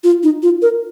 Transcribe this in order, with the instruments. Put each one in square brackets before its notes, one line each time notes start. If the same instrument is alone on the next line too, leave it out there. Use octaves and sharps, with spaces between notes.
[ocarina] F4
D#4
F4
A#4